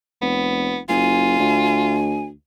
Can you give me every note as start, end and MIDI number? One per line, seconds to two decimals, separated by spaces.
0.22 0.81 29
0.22 0.78 59
0.89 1.36 30
0.89 1.96 65
0.89 2.24 80
1.39 2.32 38